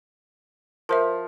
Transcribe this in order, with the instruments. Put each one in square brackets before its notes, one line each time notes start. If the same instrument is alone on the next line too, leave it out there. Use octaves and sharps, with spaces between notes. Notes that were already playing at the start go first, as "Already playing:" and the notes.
[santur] F3 [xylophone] A#4 C5 E5